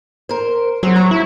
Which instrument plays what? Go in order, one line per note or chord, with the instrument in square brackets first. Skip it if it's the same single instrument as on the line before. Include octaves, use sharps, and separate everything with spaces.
[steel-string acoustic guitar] A#4 C5
[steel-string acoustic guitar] E2 C4 C5 [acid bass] F#3
[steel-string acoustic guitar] A#5
[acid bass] E4